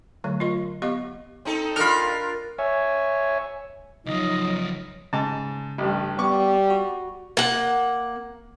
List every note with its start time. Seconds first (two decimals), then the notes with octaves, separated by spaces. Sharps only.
0.24 D3 F#3 A3
0.40 F4 A#4 D#5 C#6
0.82 B3 G4 D#5 F5 C#6
1.45 C4 D#4 A4
1.76 D4 F4 A#4 B5
2.59 C#5 E5 G#5
4.06 C#2 F3 F#3 D#4 D#5
5.13 G#2 C#3 A5
5.78 A1 G2
6.19 G3 B3 C#6 D6
6.70 F#4
7.37 A#3 F#5